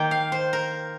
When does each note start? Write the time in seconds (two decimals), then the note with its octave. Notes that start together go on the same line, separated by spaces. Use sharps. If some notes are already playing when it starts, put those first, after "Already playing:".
Already playing: D#3 A#3 G5
0.11 F5
0.32 C5
0.53 A#4